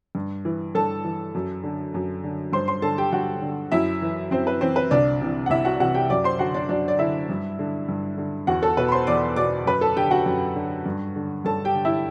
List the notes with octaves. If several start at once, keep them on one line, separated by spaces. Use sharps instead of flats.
G2
E3
G2 A4 A5
E3
F#2
D3
F#2
D3
G2 C5 C6
C5 C6
D3 A4 A5
G4 G5
G2 F#4 F#5
D3
F#2 E4 E5
E3
F#2 C4 C5
B4
E3 C4 C5
B4
C2 D4 D5
C3 E3
F#5
C2 E4 E5
F#4 F#5
C3 E3 F#4 F#5
G4 G5
F#2 D5 D6
C5 C6
D3 F#4 F#5
D4 D5
F#2 D4 D5
D5
D3 E4 E5
G2
D3
G2
D3
E2 F#4 F#5
A4 A5
B2 B4 B5
B5
C5 C6
E2 D5 D6
B2 D5 D6
F#2 B4 B5
A4 A5
D3 G4 G5
F#4 F#5
F#2
D3
G2
D3
G2 A4 A5
G4 G5
D3
E4 E5